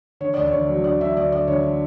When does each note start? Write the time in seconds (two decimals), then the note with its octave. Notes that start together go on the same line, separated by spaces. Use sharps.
0.20 D3 C#5
0.34 D2 D5
0.47 C#5
0.53 D2
0.69 F#3
0.84 D3 D5
1.01 D3 E5
1.16 D2 D5
1.32 D3 D5
1.48 D2 C#5
1.63 D3